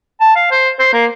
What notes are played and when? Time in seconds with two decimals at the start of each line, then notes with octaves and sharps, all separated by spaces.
0.20 A5
0.36 F5
0.51 C5
0.79 C5
0.93 A#3